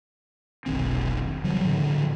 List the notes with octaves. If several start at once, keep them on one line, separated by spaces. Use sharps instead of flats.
F1 B1 D#3 C4
C#3 E3 F#3 G3
A2 D3 F3